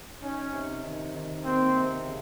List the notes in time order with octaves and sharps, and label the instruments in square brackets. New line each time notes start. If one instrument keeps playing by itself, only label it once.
[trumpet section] C#4 [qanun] D#4
[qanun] C3
D#3
D#3
[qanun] A#3 [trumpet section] C4
[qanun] C3
C#3